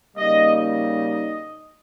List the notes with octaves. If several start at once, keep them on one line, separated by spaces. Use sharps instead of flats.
C#3 G3 A#3 D#4 D#5
D#5